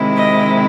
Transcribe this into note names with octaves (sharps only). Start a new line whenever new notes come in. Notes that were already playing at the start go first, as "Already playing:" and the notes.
Already playing: C3 D#3 G#3 C4 E4
D#5